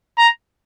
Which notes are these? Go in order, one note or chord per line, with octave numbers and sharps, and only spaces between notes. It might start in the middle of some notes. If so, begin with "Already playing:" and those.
A#5